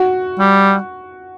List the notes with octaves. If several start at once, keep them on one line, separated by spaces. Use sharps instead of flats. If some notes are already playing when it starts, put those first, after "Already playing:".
Already playing: F#4
G3